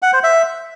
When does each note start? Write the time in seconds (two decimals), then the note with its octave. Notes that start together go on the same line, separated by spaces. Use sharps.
0.02 F#5
0.13 C5
0.24 E5